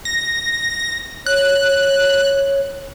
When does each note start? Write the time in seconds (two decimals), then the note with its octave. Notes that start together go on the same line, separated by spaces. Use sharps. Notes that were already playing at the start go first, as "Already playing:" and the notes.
0.05 A#6
1.26 C#5 F#6